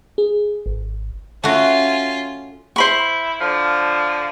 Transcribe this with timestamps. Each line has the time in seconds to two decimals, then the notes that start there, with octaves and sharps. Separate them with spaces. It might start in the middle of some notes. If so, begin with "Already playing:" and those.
0.18 G#4
0.66 G#1
1.44 A3 C#4 F4 F#4
2.76 E4 C5 B5 C#6
3.40 D3 F3